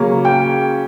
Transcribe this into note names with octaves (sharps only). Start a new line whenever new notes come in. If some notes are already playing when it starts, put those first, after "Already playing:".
Already playing: C#3 F#3 A#3 C#4
G5